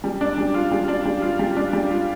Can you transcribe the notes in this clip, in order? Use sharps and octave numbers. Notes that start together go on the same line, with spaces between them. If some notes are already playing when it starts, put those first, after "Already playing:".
G3
D4
G3
F4
G3
D4
G3
F4
G3
D4
G3
F4